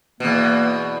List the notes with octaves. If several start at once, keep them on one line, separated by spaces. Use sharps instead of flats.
E2 B2 A#3